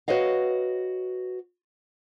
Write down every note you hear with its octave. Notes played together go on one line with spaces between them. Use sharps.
F#4 B4 C#5 D#5 F5